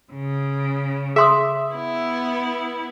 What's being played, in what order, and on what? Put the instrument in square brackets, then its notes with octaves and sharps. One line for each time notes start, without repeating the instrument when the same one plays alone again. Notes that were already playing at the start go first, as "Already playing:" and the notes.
[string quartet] C#3
[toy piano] G#4 C6 D#6 [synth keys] E5
[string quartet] B3 E4